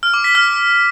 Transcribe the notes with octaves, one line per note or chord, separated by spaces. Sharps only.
F6
D6
B6
F6